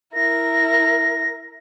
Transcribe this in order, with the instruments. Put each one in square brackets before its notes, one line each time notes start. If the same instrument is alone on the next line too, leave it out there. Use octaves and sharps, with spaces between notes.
[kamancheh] E4 A#4 [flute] A#6